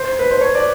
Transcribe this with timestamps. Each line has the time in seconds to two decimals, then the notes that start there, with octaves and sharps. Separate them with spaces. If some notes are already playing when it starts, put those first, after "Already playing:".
Already playing: C5
0.19 B4
0.31 C5
0.41 C#5
0.55 D5